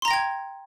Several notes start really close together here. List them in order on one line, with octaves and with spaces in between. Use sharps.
C6 A#5 A#6 G5 G#6